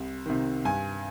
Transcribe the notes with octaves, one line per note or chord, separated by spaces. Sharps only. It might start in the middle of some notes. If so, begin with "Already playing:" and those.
Already playing: C2
C3 D#3
G2 G#5